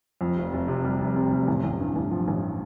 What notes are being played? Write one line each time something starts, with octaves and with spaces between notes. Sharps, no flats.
F2
F1
F1
C3
G3
F1
C3
F1
A1
A1
G2
A1
F3
A1